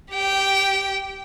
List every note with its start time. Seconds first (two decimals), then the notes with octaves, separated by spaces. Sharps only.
0.12 G4 G5